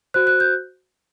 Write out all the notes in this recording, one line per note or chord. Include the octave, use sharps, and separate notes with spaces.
F#4 C5 F#6
F#6
G6